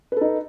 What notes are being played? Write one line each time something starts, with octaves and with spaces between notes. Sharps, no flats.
D#4 A4 B4